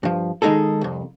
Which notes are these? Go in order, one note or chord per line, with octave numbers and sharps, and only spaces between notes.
G2 F3
D#3 G#3 A3 D#4 G#4 A4
C2 F2